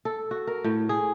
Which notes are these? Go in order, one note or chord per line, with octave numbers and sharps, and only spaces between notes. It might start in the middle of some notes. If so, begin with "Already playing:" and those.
A4
F#4
A#4
A2
G#4